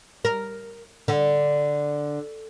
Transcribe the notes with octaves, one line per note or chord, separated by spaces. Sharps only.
A#4
D3